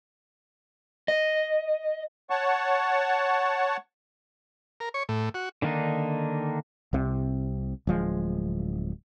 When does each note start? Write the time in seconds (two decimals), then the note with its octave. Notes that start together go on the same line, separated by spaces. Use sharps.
1.08 D#5
2.30 C#5 F#5 A5 C#6
4.80 A#4
4.94 C#5
5.09 A2
5.34 F#4
5.62 D3 D#3 A#3 D4 D#4
6.93 C2 C3
7.87 D1 F3 G#3